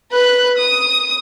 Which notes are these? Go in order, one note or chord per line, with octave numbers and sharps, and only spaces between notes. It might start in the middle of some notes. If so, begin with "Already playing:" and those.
B4 F#6
D#6